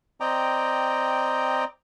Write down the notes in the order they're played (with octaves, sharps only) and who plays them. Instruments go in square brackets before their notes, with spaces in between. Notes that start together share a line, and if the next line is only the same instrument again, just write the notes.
[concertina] C4 D5 D#5 G5 A#5